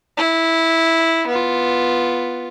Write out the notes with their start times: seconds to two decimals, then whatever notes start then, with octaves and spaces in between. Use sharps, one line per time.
0.17 E4
1.27 B3 F4